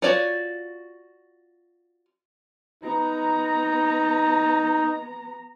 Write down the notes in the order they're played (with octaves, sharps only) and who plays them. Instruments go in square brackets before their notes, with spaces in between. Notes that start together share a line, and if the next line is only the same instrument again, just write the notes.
[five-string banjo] F4 F#4 C#5 D5
[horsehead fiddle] B3 A#5 [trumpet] D#4